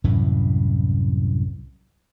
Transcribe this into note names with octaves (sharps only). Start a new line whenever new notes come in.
C2 F#2 A2 E3